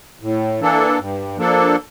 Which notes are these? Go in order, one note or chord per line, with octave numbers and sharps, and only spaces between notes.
A2
E3 A#3 D4 A4
G2
F3 A#3 D4 A4